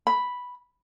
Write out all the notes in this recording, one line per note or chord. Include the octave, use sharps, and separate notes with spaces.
B5